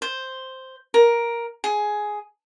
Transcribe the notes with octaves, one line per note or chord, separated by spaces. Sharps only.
C5
A#4
G#4